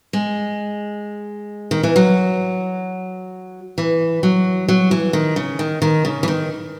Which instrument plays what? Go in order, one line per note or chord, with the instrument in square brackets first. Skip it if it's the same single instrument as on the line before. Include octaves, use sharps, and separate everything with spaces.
[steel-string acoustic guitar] G#3
D#3
E3
F#3
E3
F#3
F#3
E3
D#3
C#3
D#3
D#3
C#3
E3
D#3